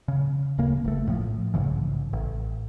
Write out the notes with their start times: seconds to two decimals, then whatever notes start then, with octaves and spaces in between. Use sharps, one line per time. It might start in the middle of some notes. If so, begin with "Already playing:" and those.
0.08 C#3
0.58 D1 C#3 A#3
0.84 F1 A3
1.06 A#1 A2 E3 F3
1.54 A#1 G#2 C#3 E3
2.13 A1